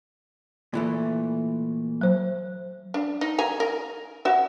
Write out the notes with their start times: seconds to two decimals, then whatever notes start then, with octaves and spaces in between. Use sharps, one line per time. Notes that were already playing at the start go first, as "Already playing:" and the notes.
0.74 A#2 E3 A3
2.01 F#3 C5
2.94 D4
3.21 D#4
3.38 G#5 A#5
3.60 A#4
4.25 F#4 E5